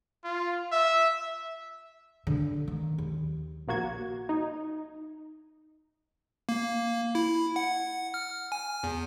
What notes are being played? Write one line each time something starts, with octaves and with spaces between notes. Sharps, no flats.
F4
E5
D3
D#3
D#2
A#1 A#3 F#4 G#6
D#4
A#3
E4
F#5
F6
G#5
E2